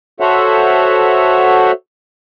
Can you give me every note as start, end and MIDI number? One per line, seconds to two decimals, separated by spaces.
0.20 1.72 66
0.20 1.72 69
0.20 1.72 72
0.20 1.72 73
0.20 1.72 76
0.20 1.72 78